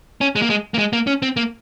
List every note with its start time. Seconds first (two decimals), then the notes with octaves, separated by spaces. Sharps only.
0.21 C#4
0.36 G#3
0.42 A#3
0.50 G#3
0.74 A#3
0.78 G#3
0.93 A#3
1.07 C#4
1.22 C4
1.37 A#3